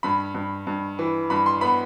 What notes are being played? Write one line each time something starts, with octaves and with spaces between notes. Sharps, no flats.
G2 B5
G2
G2
E3
G2 B5
C6
B3 B5